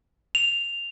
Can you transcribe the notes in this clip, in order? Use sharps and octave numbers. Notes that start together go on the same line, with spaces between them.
F7